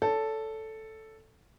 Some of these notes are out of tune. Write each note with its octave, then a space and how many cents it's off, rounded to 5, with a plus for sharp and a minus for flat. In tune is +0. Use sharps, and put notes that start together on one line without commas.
A4 +0 C#5 +40